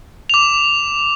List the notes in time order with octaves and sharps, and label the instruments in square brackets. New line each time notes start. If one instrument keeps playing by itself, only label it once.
[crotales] D6 F7